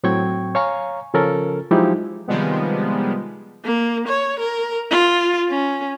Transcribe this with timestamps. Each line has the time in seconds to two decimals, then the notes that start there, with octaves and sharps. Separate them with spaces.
0.03 A2 F#3 C4 G5 C#6 G#6
0.55 C#5 F5 G#5 A#5 C#6
1.14 C#3 F3 C#4 A4 A#4
1.71 F3 F#3 G#3 D#4 E4 G4
2.28 C3 D#3 F3 G3 G#3 B3
3.64 A#3
4.08 C#5
4.40 A#4
4.90 F4
5.50 C#4